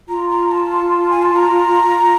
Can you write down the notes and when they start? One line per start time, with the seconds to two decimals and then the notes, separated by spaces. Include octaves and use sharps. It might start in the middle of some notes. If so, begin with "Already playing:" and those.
0.08 F4 A#5
0.30 A#5
0.52 A5
1.10 G#5
1.22 A5
1.36 A#5